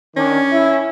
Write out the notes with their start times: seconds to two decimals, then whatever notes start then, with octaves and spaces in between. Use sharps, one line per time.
0.16 D#3 C#4 D4
0.51 E4